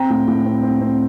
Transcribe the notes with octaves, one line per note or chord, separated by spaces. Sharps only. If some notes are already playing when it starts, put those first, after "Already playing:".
Already playing: C4 G5 A#5
A2
A2
C4
C4
C4